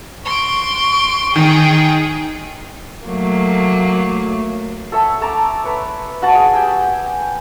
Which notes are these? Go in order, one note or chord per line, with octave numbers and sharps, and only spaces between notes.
C6 C#6 D7
D#3 D#4 G#4 G5
F#3 A3 A#3
A4 C#5 E5
A3 A5 A#5 D6
B4 C#5
F#4 F#5 A5
G#4
G4 G5 G#5 E6